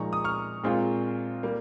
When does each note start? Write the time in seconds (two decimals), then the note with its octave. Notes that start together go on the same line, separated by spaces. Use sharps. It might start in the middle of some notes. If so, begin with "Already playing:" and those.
Already playing: A#2 F3 G#3 D#4 A#5 C#6
0.13 D#6
0.24 C#6 F6
0.64 A#2 G#3 C4 F4
1.43 G3 A#3